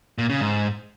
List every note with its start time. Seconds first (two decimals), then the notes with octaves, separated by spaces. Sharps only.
0.18 A#2
0.29 C#3
0.41 G#2